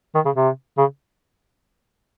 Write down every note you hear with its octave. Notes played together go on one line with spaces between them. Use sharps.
D#3
C#3
C3
C#3